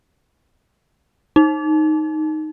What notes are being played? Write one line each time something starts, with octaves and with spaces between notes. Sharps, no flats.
D#4